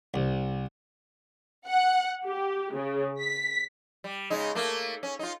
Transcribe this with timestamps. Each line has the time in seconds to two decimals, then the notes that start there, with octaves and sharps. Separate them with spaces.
0.14 C2
1.67 F#5
2.26 G4
2.74 C#3
3.21 B6
4.04 G3
4.30 C#3 G#3 D#4
4.55 A3 A#3
5.03 C#4
5.19 D#4 F4